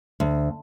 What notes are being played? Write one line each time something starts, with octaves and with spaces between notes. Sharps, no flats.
D2